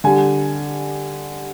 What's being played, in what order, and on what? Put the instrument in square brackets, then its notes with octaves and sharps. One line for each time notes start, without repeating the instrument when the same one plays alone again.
[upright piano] D3 G3 G#5